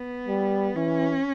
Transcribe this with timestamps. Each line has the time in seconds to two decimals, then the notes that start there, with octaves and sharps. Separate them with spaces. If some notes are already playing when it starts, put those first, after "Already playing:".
Already playing: B3
0.28 G3
0.75 E3 C#4